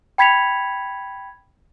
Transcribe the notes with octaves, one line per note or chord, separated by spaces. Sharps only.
G5 B5 G#6 B6 C#7 F7